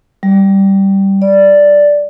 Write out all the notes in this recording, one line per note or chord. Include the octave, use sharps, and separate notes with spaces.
G3
D5